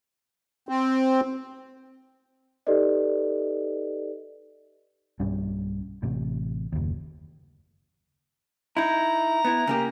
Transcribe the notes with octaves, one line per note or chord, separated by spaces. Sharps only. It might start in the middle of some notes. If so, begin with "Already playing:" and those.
C4
D#4 G4 A4 B4 D5 D#5
B1 G2 G3 C#4
A1 A2 C3
F#1 D#2
D#4 E4 A#5
B3 E4
C#3 A#3 G4